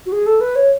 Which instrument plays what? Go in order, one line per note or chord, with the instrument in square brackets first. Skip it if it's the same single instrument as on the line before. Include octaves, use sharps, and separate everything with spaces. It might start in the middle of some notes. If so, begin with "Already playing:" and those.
[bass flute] F#4
G#4
A4
B4
C#5